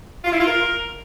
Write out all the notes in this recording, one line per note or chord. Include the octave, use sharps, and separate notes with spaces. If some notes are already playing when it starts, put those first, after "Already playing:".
F4
E4
F4
A#4